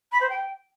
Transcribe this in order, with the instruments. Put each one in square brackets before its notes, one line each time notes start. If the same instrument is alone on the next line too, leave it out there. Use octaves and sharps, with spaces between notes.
[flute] B5
C5
G5